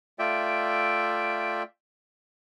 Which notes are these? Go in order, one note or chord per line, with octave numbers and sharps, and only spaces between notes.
A3 F4 D5 E5 G5